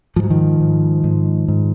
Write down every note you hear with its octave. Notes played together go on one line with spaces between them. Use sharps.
G#2 F3
F#3
D#3 F3
G#2
G#2
G#2